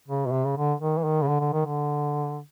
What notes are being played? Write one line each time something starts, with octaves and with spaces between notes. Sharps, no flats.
C#3
B2
C3
C#3
D3
D#3
E3
D#3
C#3
D3
D3
D#3
D3